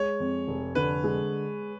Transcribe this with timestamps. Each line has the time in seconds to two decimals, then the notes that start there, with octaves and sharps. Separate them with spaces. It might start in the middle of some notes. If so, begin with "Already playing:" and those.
Already playing: G#3 C#5
0.20 F2
0.48 F1
0.75 D3 B4
1.04 G#3